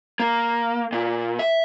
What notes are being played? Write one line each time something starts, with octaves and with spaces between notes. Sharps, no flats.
A#3
A#2
E5